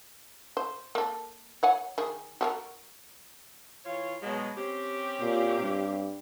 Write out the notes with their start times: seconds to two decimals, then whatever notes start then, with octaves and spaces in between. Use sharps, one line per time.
0.57 C5
0.95 A#3 A4
1.63 C#5 F#5 G#5
1.98 D#3 G#4
2.41 F#4 G#4 A#4
3.85 E3 F4 C#5
4.22 B2 F#3 G#3
4.57 C4 C#4 G4
5.21 A#2
5.60 G2